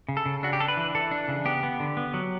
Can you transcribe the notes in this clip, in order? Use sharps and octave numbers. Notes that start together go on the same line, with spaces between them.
C#3
A4
C#3
D4 F#4
G4
D4 A4
B4
E3
E3 A4
D4
C#3
B3 G4
B3
D3
B3
F#3